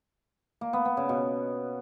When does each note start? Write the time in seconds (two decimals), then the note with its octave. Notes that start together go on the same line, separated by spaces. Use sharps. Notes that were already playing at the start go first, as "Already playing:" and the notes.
0.61 A#3
0.73 B3
0.85 B3
0.97 C#3
1.09 B2